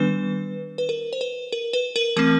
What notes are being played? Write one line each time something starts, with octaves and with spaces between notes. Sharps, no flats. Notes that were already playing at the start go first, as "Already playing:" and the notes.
Already playing: D#3 G3 B3 D4 B4
B4
A#4
C5
B4
A#4
B4
A#4
E3 A3 C4 A#4